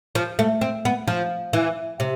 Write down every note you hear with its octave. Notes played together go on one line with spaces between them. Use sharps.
F3
A3
C4
B3
F3
E3
C3